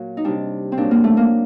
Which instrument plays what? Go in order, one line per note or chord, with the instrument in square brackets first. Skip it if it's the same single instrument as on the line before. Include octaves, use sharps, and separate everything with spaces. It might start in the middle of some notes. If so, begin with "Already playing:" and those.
Already playing: [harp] A#2 F#3 F#4
D#4
C3 G3 D4
C4
A#2 F#3 D4
A#3
A3
A#3